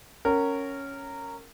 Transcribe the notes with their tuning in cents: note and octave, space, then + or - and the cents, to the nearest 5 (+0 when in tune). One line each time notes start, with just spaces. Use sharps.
C#4 +0 A#4 -15 F#5 +25